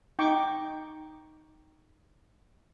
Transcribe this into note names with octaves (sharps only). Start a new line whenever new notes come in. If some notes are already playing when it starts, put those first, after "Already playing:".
D#4 G5 C#6 D6